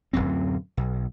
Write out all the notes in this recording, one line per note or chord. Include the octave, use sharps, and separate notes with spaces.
D1 G1 F#2 C4
B1